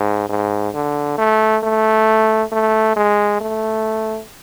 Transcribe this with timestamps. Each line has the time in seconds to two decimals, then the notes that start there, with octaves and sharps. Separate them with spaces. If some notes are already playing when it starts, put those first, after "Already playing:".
Already playing: G#2
0.29 G#2
0.75 D3
1.18 A3
1.64 A3
2.52 A3
2.96 G#3
3.41 A3